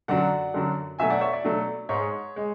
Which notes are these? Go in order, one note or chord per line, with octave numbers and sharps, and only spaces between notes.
F#2 D3 F#3 D5 F#5
F#2 D3 F#3
B2 F#3 A3 E5 G#5
D5 F#5
C#5 E5
D5
B2 F#3 A3
G#2 G#3 C#5
G#3